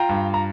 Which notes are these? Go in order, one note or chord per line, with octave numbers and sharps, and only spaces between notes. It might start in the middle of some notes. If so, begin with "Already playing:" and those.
Already playing: F4 G5 A#5
G2
A#5